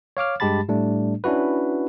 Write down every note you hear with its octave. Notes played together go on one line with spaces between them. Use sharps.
C#5 F5 D6 F6
G2 G#3 G4 A5 B5 A6
A2 G3 A3 D4
C#4 D4 E4 F#4 B4